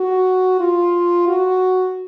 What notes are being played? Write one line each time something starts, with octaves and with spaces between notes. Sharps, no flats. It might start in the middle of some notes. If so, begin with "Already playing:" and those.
Already playing: F#4
F4
F#4